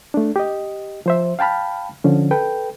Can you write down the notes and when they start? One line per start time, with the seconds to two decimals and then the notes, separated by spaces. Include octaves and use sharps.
0.14 A3 D4
0.36 G4 D#5
1.06 F3 C5 E5
1.39 F5 G5 A5 B5 F6
2.04 D3 F3 C#4
2.31 A4 B4 G5